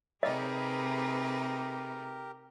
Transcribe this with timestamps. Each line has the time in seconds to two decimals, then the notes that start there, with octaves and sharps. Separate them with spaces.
0.23 C3 A3 D#4 G4 G#4 A#4 B4 D#5